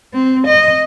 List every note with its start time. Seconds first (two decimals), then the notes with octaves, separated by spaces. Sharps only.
0.13 C4
0.47 D#5